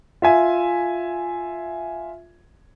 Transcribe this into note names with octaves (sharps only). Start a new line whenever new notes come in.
F4 E5 G#5